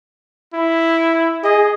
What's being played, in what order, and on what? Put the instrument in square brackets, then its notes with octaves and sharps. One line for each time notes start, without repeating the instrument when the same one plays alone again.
[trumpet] E4
[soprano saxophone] G#4 [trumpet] D#5